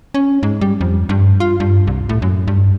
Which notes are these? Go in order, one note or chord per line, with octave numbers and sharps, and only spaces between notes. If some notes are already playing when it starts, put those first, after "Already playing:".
C#4
G#2
G3
F2
G2
F4
G2
C2
A2
F#2
G2